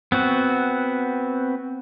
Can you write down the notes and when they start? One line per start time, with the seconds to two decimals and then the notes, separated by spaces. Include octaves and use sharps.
0.12 B3 C4 F#4